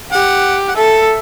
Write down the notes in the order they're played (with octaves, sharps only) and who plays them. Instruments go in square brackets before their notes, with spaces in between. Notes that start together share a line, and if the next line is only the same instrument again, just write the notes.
[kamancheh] G4 [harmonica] F#5
[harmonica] F#5
[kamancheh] A4 [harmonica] E5